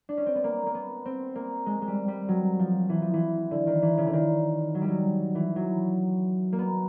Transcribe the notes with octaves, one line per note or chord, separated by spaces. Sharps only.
D4
C#4
C4
B3
A#3
A#3
B3
C4
A#3
G#3
G#3
G3
G3
F#3
F3
E3
F3
E3
D3
D#3
E3
C#3
D3
D#3
F#3
G3
F#3
E3
F#3
A#3
B3